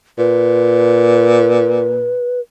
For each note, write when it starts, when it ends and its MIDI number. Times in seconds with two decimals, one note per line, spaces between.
0.18 2.17 46
0.18 2.40 71